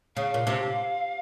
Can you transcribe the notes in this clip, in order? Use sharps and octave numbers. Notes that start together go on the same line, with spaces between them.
C#3 F5
A#2
C3